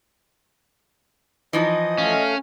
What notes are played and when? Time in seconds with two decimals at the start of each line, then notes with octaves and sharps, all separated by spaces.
1.53 E3 F3 D#4 D#5
1.98 A3 C#4 F5